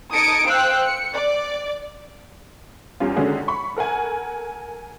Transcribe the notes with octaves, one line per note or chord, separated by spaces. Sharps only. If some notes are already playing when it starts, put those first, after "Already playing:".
D#4 A5 D#6 G#6 C#7 D7
C5 F5 G5 E6 F#6
C#7
D5
E2 G3 C#4 F4
D3 D#3 G#3 C#4 F#4 G#4
B5 C#6
A4 A#4 F#5 G#5